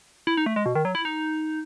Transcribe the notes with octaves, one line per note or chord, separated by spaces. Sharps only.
E4
D#4
A3
G#3
B2
D#3
F#3
E4
D#4